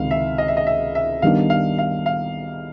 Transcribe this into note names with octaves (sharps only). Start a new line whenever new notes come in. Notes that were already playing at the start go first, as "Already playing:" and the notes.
Already playing: C#2 C3 D#3 F5
E5
D#5
E5
D#5
E5
E5
D#3 G3 B3 D4 F5
F5
F5
F5